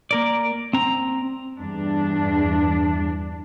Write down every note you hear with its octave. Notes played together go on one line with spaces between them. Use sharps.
A#3 A#4 D5
C4 A#5
E2 G2 D4